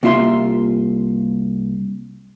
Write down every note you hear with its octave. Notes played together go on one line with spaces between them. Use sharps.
C2 A#3 F4 E5 C6